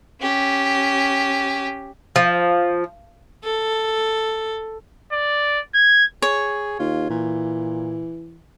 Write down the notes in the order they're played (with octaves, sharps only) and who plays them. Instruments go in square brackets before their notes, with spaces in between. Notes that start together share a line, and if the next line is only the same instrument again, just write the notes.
[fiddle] C#4 G4
[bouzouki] F3
[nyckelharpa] A4
[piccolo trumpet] D5
G#6
[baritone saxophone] G#4 [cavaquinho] C#5
[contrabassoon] D#2 [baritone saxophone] F4
[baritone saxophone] A#2 [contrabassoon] E3